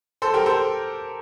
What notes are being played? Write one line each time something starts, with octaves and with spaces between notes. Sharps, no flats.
A4 C5
G4 A#4
A4 C5